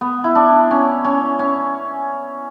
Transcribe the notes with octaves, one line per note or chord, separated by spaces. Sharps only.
B3
E4
D4
C#4
C#4
C#4